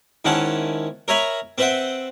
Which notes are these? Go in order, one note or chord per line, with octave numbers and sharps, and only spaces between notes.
G#2 D#3 C#4 E4 F#5 A5
A#4 C#5 E5 G#5 A#5 B5
C4 B4 C5 E5 F#5 G5